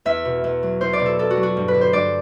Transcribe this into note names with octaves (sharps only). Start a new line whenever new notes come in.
E2 E5
B2
E2
F#3
E2 C5
D5
B2
A4
E2 A4
F#4
F#3
F#4
G2
B4
D3
C5
G2 D5